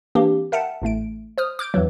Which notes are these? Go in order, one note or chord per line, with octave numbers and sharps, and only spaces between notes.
E3 A#3 C4 D4 G4
A#4 E5 F#5 G5 A5
A1 A2 A3 D7
C5 D#6 F6
D6 F6 G6 D7
E2 G2 E3 F#3